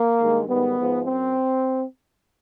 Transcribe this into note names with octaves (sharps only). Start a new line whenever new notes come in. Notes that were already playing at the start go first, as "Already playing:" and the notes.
Already playing: A#3
G2 D#3 G#3
G#2 D#3 G3 B3
G#2 F3 G#3
F#2 C4